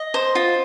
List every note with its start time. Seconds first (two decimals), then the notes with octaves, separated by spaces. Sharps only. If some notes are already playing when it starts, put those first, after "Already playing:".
Already playing: D#5
0.14 C5
0.35 F4